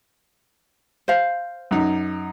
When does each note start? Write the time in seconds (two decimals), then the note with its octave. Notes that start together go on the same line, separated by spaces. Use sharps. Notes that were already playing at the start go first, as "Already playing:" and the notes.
1.08 C5 F5
1.71 F#2 D#4